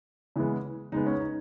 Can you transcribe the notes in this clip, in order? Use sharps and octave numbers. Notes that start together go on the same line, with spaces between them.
C#3 E3 G#3 B3
C#3 G#3 B3 D#4
C#4
D#4